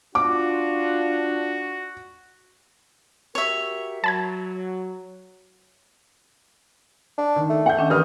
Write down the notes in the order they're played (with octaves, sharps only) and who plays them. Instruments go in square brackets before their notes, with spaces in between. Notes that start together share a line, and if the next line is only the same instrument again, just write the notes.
[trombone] D4 [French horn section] F4 [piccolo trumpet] F#4 [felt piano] D6
[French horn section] F#4 G4 A#4 [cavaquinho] C#5 E5
[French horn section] F#3 [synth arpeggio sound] A5 B5 G#6
[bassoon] D4
[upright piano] D#3
[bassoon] A3
[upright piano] F#5 G6
[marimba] D#3 C#4 D4
[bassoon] G2 [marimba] E3 A#4 [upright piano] B5 D#6 F6